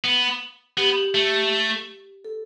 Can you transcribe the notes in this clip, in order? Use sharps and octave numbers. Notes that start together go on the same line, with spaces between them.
B3
B3 G4
A3
A4